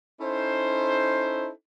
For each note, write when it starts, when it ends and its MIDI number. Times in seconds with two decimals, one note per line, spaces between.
0.21 1.50 61
0.21 1.50 63
0.21 1.50 64
0.21 1.50 69
0.21 1.50 72